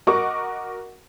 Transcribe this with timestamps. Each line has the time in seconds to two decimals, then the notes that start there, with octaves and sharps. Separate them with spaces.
0.07 F#4 A#4 D#5 F#5 C#6 D6